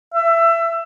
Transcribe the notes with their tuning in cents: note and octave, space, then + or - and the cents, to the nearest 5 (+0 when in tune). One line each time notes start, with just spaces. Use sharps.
E5 +20